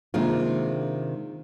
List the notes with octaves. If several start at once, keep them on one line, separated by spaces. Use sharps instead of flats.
C3 D#3 G#3 A#3 D4 F4